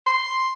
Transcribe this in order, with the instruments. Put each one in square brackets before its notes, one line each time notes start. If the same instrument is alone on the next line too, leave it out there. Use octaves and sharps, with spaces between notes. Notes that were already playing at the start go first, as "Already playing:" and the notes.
[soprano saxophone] C6